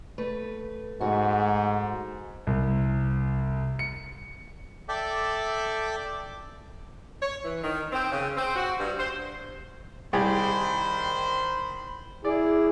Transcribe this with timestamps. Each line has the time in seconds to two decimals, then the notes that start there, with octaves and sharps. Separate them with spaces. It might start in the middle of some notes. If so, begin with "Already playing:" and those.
0.18 A3 B4
1.01 G#2 A3 F#4
2.47 C2
3.79 C#7
4.89 A4 D5 E5 G5 D6
7.22 C#5
7.45 E3
7.64 D#3
7.93 C4
8.12 C#3
8.37 C4
8.56 F#4
8.79 G2
9.00 C5
10.13 C2 D#3 G4 G#4 C5 B5
12.25 E4 G#4 D5